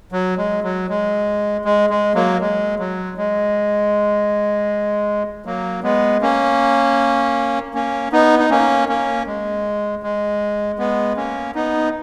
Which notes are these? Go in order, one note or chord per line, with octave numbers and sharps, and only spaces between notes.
F#3
G#3
F#3
G#3
G#3
G#3
F#3 A#3
G#3
F#3
G#3
F#3 A#3
G#3 B3
A#3 C#4
A#3 C#4
B3 D#4
D#4
A#3 C#4
A#3 C#4
G#3
G#3
G#3 B3
A#3 C#4
B3 D#4